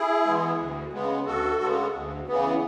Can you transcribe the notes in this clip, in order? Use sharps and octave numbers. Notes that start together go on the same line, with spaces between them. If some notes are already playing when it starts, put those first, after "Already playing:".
Already playing: E4 G#4
E3 G#3 B3
D2
C#3 G#3 B3
D2 F#4 A4
C#3 G#3 B3
D2
C#3 E3 B3